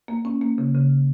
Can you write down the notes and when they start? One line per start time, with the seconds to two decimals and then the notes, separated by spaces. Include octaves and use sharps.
0.08 A#3
0.25 C#4
0.42 A#3
0.58 C#3
0.75 C#3